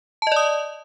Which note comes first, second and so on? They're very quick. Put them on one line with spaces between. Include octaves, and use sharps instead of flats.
A5 D#5 D5 D#6